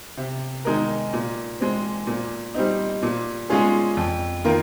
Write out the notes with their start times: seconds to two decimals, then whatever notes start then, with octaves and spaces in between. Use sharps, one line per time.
0.17 C3
0.65 D#3 G#3 D#4 A#4
1.13 A#2
1.60 G#3 C4
2.07 A#2
2.55 G3 C4 D#4
3.02 A#2
3.50 G#3 C#4 F4 G#4
3.97 F2
4.44 D#3 A#3 F4 A#4